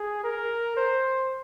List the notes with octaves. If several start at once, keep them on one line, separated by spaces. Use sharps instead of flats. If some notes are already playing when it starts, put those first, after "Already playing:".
Already playing: G#4
A#4
C5